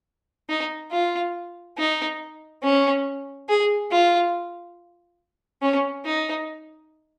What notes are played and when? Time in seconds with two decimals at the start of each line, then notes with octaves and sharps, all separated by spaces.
0.49 D#4
0.92 F4
1.78 D#4
2.63 C#4
3.49 G#4
3.91 F4
5.62 C#4
6.05 D#4